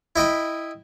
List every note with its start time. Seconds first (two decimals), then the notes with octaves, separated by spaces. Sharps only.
0.16 E4 D#5 G5 B5